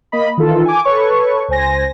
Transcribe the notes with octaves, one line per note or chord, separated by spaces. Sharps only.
A#3 D#5 B5
D#3 E3 F4 A4
G#5 D6
A4 B4 C#5 C#6
C#2 C5 G#5 A#6